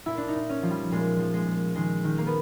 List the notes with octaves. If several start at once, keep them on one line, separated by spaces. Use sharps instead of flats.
A#2 E4
D4
D#4
A#2
C#4
F3
G3
A#2 G#3
F3
G#3
A#2
D#3 G#3
D#3
A#3
B3